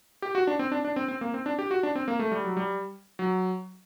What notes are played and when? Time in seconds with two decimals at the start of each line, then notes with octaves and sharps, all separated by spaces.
0.22 G4
0.35 F#4
0.47 D4
0.59 C4
0.72 D4
0.85 D4
0.96 C4
1.08 C4
1.21 A#3
1.34 C4
1.46 D4
1.59 G4
1.71 F#4
1.83 D4
1.95 C4
2.08 A#3
2.19 A3
2.32 G3
2.44 F#3
2.57 G3
3.19 F#3